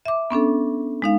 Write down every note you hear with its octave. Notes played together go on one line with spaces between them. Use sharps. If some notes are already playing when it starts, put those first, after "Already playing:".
E5 D6
B3 C#4 D4 A4
G#3 D#4 F5